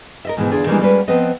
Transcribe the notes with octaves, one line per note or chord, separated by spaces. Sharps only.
A#4 D#5 E5
G#2 B2 D#3 E3 G#3
E2 D3 D4 F4 G#4 D5
D#3 E3 G3 G#3 A#3 D4
G3 G#3 A#3 C#4 F#4 B4
F3 B3 C4 B4 D#5